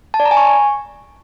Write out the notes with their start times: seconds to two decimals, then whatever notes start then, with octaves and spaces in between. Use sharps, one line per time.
0.14 A5
0.20 D5
0.25 A#5
0.31 G#5
0.37 C#6